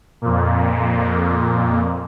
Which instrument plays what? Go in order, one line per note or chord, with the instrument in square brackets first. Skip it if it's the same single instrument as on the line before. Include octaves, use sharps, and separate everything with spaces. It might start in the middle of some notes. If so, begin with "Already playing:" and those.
[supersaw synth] F2 A#2